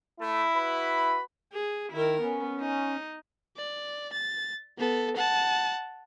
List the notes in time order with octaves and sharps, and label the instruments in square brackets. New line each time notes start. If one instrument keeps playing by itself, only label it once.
[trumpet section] A3 [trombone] E4
[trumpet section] F#4 B4 B5
[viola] G#4
[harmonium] D#3 [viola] E4 A#4
[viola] B3 [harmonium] C#4
[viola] D#4
[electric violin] D5
A6
B3 A4
F#5 A5